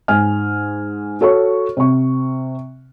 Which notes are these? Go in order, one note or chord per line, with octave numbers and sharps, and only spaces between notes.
G#2 G#5 F6
F#4 A4 C#5 C#6
C3 C#6